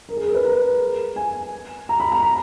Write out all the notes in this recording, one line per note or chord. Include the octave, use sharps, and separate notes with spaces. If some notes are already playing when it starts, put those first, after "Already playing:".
A#4
G#4
A#4
B4
A#4
G#5
A#5
B5
A#5
B5